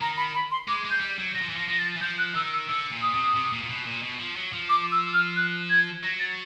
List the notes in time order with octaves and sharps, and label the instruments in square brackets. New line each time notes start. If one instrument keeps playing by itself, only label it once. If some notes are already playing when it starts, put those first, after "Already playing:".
[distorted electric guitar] D#3 [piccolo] A#5
[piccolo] B5
B5
C6
[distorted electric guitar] G#3 [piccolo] D6
[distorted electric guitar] G#3
[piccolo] G6
[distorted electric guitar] G3
F#3
[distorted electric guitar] F#3 [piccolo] A#6
[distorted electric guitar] F3
E3
[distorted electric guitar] F3 [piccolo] A#6
[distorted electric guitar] F3 [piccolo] A#6
[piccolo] A6
[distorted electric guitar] E3
[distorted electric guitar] F3 [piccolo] G6
[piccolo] F#6
[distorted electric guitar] D#3 [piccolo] E6
[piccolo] E6
[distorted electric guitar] D3 [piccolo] E6
[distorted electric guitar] A#2
[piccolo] D#6
[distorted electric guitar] C3
C3
A#2
A#2
B2
A#2
B2
F3
F#3
F3
[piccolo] D6
E6
F6
F#6
G#6
[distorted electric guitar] F#3 [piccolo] A#6
[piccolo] A6